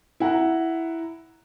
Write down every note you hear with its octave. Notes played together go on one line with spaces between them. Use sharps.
E4 F#5 A#5